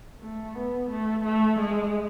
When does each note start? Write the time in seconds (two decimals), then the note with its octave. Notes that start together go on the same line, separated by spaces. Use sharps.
0.21 A3
0.55 B3
0.90 A3
1.24 A3
1.59 G#3